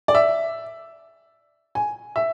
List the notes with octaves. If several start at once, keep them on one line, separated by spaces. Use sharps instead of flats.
D5
E5
G#5
E5